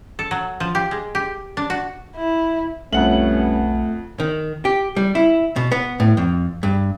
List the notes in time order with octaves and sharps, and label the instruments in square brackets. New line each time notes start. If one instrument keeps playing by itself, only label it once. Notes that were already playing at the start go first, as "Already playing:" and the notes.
[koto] A4
F#3
F3
G4
G#3
G4
D4
F#4
[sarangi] E4
[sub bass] B1 [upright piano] F2 F#5 F#7 [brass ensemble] G3 B3 C#4 [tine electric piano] A3
[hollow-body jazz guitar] D#3
G4
G3
E4
B2
B3
A2
F2
G2